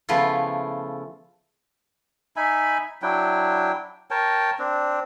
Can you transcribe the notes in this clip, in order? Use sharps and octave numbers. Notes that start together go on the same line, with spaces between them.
C#3 F3 A3 B3 E4 F4
D#4 E5 G#5 B5
F#3 D4 E4 G5
A#4 C#5 G5 A5
C4 D4